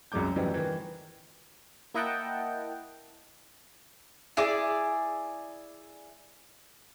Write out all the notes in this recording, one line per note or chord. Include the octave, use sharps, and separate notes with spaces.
C2 F#2 F#3 G#3 D6 G6
F#2 A2 E3 F3 G3 D#4
D#3 E3
A#3 E4 D#5 F#5 G5 A5
E4 G#4 D5 D6